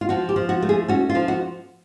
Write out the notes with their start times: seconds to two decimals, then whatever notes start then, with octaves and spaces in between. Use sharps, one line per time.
0.01 F4
0.09 F3 F#4
0.29 G4
0.36 F3
0.49 F#4
0.62 A3
0.69 G#4
0.88 C#4 F#4
1.09 F4
1.15 F3
1.28 F#4